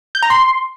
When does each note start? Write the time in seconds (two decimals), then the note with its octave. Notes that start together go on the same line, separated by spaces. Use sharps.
0.15 G6
0.22 A#5
0.30 C6